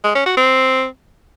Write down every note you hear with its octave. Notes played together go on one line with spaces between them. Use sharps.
G#3
C#4
F#4
C4